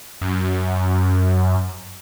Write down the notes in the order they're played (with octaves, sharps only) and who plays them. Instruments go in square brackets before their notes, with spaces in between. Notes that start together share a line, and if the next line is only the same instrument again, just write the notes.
[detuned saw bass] F#2